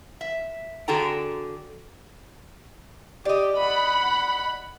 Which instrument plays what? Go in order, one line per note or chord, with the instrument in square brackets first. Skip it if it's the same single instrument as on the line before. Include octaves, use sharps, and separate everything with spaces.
[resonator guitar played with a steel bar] E5
D3 F#4 G#4 A4 G5 A#5
[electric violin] G4 [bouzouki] D5 D#5
[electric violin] F#5 B5